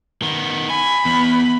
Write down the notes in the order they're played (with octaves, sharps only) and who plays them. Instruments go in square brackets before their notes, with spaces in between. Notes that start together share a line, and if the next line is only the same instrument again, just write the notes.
[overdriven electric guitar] D#3 B3
[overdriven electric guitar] G#5 [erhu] B5
[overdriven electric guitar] E2 [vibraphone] B3